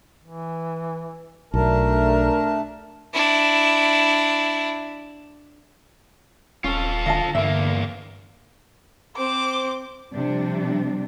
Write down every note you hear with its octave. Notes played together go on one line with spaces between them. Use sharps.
E3
B1 A3 D4 A#4 A5
D4 E4
D#1 C#4 F4 A4
D3 D#5 F5 A5
E2 G2 A#3 E5
C4 C5 D6
C3 F3 G3 D4